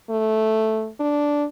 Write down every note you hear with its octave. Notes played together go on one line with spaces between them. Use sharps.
A3
D4